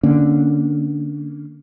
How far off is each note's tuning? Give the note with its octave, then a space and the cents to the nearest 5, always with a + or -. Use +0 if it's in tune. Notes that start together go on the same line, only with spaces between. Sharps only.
D3 +0 A#3 +0 C#4 +0